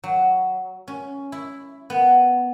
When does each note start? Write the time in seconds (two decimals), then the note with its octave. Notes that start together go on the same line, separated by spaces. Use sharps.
0.04 F#3
0.88 C#4
1.32 E4
1.90 B3